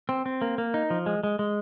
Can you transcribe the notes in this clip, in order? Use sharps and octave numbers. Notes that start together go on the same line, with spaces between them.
C4
C4
A#3
A#3
D#4
F3
G#3
G#3
G#3